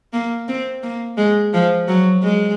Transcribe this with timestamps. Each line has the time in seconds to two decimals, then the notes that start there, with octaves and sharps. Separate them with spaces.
0.13 A#3
0.48 C4
0.83 A#3
1.17 G#3
1.54 F3
1.88 F#3
2.23 G#3